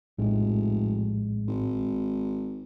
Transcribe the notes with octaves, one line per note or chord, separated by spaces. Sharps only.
F1 A#1 A2 G#3
G#1